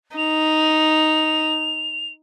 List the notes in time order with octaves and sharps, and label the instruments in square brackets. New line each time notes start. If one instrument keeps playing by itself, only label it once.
[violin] D#4 [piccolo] F7